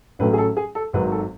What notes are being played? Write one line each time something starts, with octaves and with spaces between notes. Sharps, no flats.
A1 A2 F#3 A3 C#4 B4
G#4
A4
G#4
A4
G#1 G#2 D#3 F#3 B4
A4